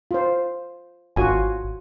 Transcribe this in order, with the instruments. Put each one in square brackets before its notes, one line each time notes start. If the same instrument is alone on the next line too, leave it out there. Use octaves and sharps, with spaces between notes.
[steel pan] F4 C5
[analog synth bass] G#1 [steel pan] F4 F#4 G#5